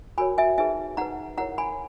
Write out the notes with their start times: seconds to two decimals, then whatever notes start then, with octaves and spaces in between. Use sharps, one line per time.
0.18 F#4 A#4 C#5 G#5 B5
0.38 E5 G#5
0.58 D#4 G#4 B4 E5 G#5
0.97 D#4 G#4 B4 F#5 A#5
1.38 E4 A#4 C#5 F#5 A#5
1.58 G#5 B5